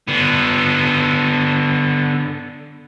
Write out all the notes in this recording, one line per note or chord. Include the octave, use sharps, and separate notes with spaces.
D3 B3